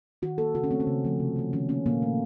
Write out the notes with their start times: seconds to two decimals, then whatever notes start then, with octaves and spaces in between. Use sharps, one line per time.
0.22 D#3 F#4
0.38 F#3 A#3 A4
0.54 C#3 F#4
0.64 C#4
0.71 A3 C4
0.80 C#4
0.87 C#3
1.05 F3 A3
1.20 C3
1.36 F#3 A3
1.53 D#3 C#4
1.69 F#3 A#3 C#4
1.86 A#2 A#3
2.02 A3